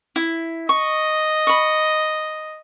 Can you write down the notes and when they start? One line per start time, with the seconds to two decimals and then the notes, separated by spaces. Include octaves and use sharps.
0.16 E4
0.69 D#5 C#6
1.47 B5 C#6